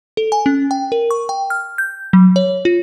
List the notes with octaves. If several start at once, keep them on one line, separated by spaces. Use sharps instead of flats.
A4
G#5
C#4
G5
A#4
C#6
G5
F6
G6
F#3
C#5
F4